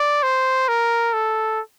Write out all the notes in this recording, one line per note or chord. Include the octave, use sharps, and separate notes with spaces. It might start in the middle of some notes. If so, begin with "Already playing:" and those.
Already playing: D5
C5
A#4
A4